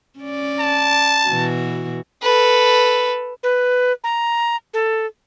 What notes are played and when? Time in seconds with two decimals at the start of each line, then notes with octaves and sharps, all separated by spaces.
0.19 C#4 D5
0.60 A5
1.28 B2 E3 F#4
2.22 A4 B4
3.43 B4
4.04 A#5
4.74 A4